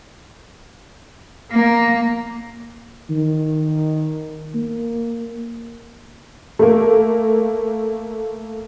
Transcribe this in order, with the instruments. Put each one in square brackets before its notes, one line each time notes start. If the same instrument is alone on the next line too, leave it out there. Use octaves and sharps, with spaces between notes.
[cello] A#3
[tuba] D#3
A#3
[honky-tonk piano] A3 A#3